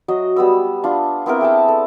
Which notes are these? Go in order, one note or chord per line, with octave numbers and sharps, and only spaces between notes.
F#3 F#4 D#5
G3 B3 E6
D4 F4
B3 C4 E4 A#4
G#4 G5 A5
A4